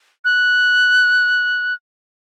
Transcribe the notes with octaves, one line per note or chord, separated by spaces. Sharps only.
F#6